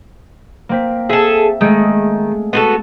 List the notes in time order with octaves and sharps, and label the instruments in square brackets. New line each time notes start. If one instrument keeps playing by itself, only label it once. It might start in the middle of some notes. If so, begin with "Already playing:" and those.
[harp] A#3 C4 B6
[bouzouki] G#4 A4 [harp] E5
[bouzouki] D#3 [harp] G#3 A3
[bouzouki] B3 F#4 A4